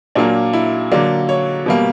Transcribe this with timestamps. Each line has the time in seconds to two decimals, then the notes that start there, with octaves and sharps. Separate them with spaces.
0.15 A#2 F#3 A#3 D4
0.53 E4
0.92 D3 F#3 A#3 D5
1.29 C#5
1.66 B2 G3 A#3